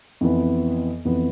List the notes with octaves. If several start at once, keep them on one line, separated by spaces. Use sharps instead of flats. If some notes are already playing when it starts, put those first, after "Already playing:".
F2 E3 B3
F2 E3 B3